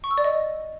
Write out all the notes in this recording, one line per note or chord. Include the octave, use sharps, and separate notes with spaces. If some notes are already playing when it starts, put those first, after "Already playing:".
C#6
E6
D5
D#5